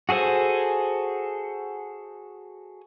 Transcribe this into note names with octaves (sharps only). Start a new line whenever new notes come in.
F#4 G#4 A4 C5 G#5